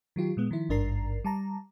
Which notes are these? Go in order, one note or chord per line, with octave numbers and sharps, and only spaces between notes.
D#3 F#3 F4 G4
A#2 G#3 B3
D#3 F3 E4
G#1 G2 D4 A#4 A#5 C7
G3 A5 A#5